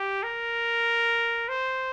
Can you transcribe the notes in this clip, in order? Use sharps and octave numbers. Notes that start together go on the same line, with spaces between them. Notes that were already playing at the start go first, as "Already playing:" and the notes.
Already playing: G4
A#4
C5